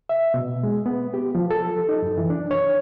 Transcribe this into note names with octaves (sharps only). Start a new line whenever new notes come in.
E5
B2
G#3
B3
G4
F3
A4
D#4
F#2
E3
D4
C#5